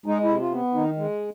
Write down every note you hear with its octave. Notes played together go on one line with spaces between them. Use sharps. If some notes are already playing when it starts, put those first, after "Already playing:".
G#3 D#4
E4
C3
F4
B3
D#3 D#4
G#3